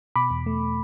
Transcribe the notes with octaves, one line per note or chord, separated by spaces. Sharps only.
B2 B5 D6
E2
A3